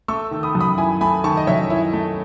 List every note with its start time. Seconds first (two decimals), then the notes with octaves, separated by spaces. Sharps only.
0.08 A3 C#6 E6
0.31 D#3
0.43 B5 D#6
0.55 F#2
0.60 B5 D#6
0.78 E4 G#5 B5
1.01 A3 G#5 B5
1.24 D#3 A5 C#6
1.37 D#5
1.47 F#2 C#5 E5
1.70 E4
1.93 A3